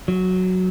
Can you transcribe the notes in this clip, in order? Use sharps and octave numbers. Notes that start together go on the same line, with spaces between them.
F#3